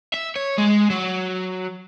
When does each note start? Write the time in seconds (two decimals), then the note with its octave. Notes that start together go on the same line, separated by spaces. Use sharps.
0.14 E5
0.36 C#5
0.58 G#3
0.90 F#3